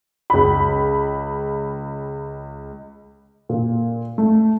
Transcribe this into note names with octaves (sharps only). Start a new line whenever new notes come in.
C#2 B5
A#2
A3